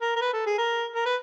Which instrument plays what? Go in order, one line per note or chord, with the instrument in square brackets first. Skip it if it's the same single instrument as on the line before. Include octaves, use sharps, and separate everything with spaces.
[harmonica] A#4
A#4
B4
A4
G#4
A#4
A#4
B4